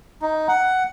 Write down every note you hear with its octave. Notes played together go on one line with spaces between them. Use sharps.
D#4
F#5